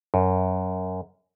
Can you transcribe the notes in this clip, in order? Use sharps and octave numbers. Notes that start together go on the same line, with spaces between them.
F#2